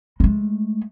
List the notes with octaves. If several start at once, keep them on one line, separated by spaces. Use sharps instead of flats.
G#3 A3